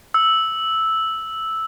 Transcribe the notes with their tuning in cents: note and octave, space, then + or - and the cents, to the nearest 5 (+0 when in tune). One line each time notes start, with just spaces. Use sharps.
E6 -5